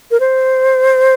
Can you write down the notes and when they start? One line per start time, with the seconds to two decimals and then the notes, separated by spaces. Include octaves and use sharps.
0.11 A#4
0.20 C5